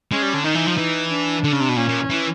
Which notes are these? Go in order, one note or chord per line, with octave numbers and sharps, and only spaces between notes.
G#3 C#4
G3
D3
D#3 D#4
E3
F3
E3
D4
D3
C#3
C3
B2
A#2 C#4
A#2
E3